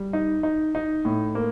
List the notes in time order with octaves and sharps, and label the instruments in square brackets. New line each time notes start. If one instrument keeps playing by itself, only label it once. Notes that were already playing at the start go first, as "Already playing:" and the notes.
Already playing: [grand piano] G3
D#4
D#4
D#4
A2
A#3